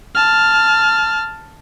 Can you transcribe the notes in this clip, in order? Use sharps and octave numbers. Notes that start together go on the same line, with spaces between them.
A5 F6